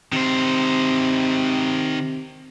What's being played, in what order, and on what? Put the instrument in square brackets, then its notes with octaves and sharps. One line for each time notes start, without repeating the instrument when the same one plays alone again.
[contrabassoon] C3 [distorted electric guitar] D#3 C5